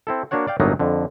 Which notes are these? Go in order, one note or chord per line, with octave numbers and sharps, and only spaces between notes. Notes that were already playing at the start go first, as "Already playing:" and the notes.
C4 E4 A4
A#3 D4 F#4 C#5 F#5
D5 F5 G5
G1 A2 F#3 A#3 B3 D#4
F2 D3